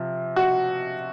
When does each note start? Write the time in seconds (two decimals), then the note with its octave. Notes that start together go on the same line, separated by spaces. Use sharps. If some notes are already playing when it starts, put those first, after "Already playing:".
Already playing: C3 F3
0.36 F#4